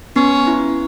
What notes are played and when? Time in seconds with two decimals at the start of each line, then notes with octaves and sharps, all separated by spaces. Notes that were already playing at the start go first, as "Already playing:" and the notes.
0.16 B3 C#4
0.47 E4